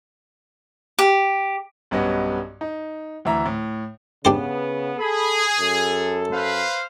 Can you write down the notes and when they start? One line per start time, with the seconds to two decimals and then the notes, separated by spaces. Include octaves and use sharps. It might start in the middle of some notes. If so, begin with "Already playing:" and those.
0.99 G4
1.91 B1 G2 B3 C#4 D#5
2.61 D#4
3.25 D2 E3 E5 A#5
3.46 A2
4.25 C#3 B3 D4 G4 C5
4.99 G#4 A4 B5
5.59 F#2 A4
6.33 B4 C5 F5